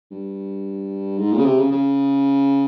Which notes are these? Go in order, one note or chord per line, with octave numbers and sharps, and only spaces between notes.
G2
G#2
A#2
C#3
C3
C#3
C#3